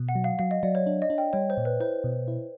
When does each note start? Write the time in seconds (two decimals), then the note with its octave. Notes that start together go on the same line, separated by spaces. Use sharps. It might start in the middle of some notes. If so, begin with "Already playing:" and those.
Already playing: B2
0.09 F#5
0.15 F#3
0.24 F5
0.39 F#3 F5
0.51 D#5
0.63 F#3 D5
0.75 C#5
0.87 D4
1.02 D#5
1.10 D4
1.18 G5
1.33 G3 C#5
1.50 C5
1.57 A#2
1.65 B4
1.80 E4 C5
2.04 B2
2.28 E4